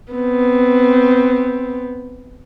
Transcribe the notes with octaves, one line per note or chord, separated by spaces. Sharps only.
B3 C4